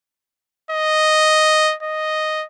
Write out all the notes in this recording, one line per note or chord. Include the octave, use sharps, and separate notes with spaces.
D#5
D#5